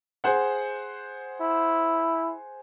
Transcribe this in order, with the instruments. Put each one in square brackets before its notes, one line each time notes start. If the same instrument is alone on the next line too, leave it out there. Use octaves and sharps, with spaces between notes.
[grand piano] G#4 C5 F#5
[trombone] E4